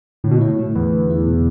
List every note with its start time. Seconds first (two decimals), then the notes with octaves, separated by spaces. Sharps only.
0.24 A2 D3
0.31 B2
0.39 A2 E4
0.59 A3
0.75 E2 B4
0.93 D3
1.10 E4
1.27 B2